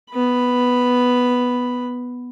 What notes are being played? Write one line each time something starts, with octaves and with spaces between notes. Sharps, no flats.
B3 B5